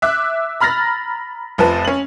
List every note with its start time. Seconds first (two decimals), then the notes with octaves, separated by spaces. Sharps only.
0.02 E5 D6 E6 F#6
0.60 A#5 B5 F6 A6 A#6
1.58 F1 F3 B4 A5
1.85 C#4 F#7